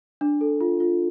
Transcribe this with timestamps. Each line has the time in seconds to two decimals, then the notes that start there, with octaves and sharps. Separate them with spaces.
0.21 D4
0.41 A4
0.61 F4
0.80 F4